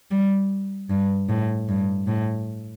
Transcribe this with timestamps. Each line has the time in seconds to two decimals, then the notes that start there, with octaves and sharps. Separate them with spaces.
0.11 G3
0.90 G2
1.29 A2
1.69 G2
2.07 A2